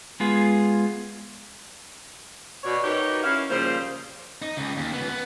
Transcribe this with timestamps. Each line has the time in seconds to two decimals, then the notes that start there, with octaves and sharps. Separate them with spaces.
0.20 G#3 B3 F4 G#4
2.63 B2 C#5 D5
2.84 D#4 F#4 G4 A#4 B4 C#5
3.23 C#4 E4 A#4 E5 F5
3.49 C#3 F3 G3 A#3 C5
4.42 D#4
4.57 C#2
4.77 D#2
4.93 C#2 B3
5.09 B3